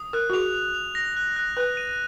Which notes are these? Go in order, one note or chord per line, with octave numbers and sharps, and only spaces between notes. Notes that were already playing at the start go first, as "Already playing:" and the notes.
Already playing: D#6
A#4 F#6
F#4
G#4 F7
F7
F7
A#6
F#6
F#6
B4 F#6
D#7